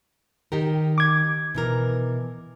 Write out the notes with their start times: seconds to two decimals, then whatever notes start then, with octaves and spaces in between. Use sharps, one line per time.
0.52 D#3 G4 A#4
0.98 D6 G#6
1.54 B2 E3 A#4